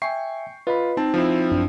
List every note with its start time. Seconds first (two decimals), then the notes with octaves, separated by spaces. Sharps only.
0.02 E5 G5 G#5 C#6 C7
0.67 F4 B4 D#5 B5
0.97 C4 D#4 A5
1.14 F3 C4 E4
1.51 A1 F#2 D4